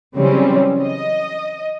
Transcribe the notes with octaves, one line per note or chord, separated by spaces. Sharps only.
C#3 E3 F#3 G3 C4 C#4
D#5